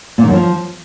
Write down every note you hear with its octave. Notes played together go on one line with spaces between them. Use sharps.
A#2
D#3
F#2
F3